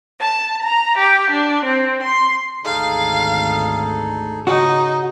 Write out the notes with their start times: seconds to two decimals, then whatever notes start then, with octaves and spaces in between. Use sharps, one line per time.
0.20 A5
0.62 A#5
0.97 G4
1.30 D4
1.65 C4
2.02 C6
2.65 G#1 D2 D#4 G#4 A4 F5
4.47 C#3 D#4 F#4